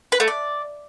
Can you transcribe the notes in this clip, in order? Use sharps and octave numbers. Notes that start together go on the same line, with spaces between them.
B4
A3
D5